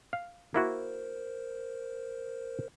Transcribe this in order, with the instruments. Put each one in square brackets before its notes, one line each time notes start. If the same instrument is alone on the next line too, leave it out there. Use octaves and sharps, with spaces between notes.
[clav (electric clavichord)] F5
[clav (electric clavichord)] A#3 E4 F#4 [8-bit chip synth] A#4 C5